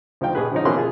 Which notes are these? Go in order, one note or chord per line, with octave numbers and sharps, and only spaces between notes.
D2 F3 D#4 F5 G5
A#1 G#4 B4
D3 F3 C#4 D#4
B2 E3 A#3 C#4 C6 F#6
F4 G#4